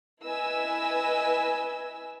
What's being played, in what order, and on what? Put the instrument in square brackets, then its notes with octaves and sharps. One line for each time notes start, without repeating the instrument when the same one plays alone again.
[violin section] E4 B4 D#5 G#5 E6